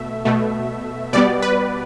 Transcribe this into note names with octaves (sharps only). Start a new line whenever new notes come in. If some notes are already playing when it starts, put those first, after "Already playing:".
Already playing: B2 A3 E5
B2 A3
B2 G3 B3 D5
B4